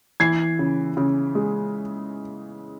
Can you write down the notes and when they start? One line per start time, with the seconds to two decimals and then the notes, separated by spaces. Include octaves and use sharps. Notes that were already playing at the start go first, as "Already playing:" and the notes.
0.20 E3 G#6 C7
0.59 C#3
0.97 C#3
1.35 G#3